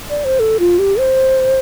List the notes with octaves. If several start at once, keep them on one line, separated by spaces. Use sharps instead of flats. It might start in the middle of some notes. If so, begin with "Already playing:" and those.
D5
C5
A4
F4
G4
C5